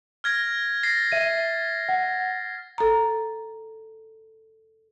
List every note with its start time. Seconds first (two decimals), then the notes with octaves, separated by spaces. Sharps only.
0.24 F6 G#6 A#6
0.83 A6 A#6 C7
1.12 E5 D#7
1.89 F#5
2.78 A4 A#5